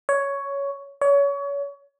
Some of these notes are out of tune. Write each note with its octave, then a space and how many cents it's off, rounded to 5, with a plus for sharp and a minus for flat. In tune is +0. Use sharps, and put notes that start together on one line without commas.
C#5 +10
C#5 +30